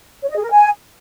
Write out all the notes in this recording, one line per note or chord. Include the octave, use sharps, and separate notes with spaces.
C#5
D#5
G#4
A#4
G#5